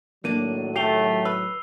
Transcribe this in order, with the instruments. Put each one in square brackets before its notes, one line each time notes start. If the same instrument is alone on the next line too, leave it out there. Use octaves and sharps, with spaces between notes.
[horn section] A2 D#3 F#3 [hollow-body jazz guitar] A#3 D4 [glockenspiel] D#7
[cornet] A3 [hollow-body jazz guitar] G4 [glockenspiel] C7 F7 G7
[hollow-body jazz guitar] B4 [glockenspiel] E6